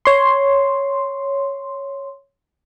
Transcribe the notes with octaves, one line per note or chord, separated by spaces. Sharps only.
C#5 C6